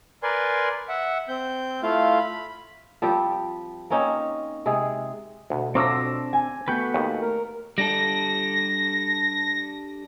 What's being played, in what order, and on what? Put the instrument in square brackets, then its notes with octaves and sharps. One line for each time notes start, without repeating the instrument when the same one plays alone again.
[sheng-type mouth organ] A#4 B4 D5 G#5 C6
E5 F#5
C4 G6
A3 E4 F4 F5
B5
[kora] F3 G3 C4 G4
A#3 C4 C#4 D#4
C3 G#3 G#4
[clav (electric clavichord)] D2 [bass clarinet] B2
[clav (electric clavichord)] D2 F3 F#3 [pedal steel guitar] C4 D4 E6 [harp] D6 A#6
[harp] G#5
[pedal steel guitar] A3 F#4 B4 [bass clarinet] B3 [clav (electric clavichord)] G5 [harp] G6
[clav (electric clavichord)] D#2
[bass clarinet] A#4
[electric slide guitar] G3 D4 A4 [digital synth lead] A#6